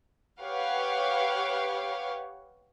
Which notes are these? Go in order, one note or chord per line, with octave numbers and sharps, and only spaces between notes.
G4 B4 C#5 F5 F#5